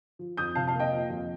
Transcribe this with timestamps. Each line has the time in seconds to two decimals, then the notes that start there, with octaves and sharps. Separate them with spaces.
0.19 F3
0.37 F2 D#6 G6
0.55 C3 F5 A5
0.67 F5 A5
0.73 A#3
0.80 D#5 G5
0.92 F3
1.10 F2